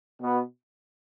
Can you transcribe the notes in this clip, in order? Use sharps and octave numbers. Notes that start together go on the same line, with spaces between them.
B2 B3